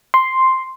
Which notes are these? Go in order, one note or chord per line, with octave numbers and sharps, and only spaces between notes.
C6